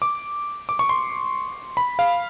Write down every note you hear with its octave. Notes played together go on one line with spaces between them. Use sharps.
D6
D6
C#6
C6
B5
F5